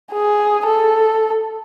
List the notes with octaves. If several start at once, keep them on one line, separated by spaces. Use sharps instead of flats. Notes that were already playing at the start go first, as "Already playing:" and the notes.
G#4
A4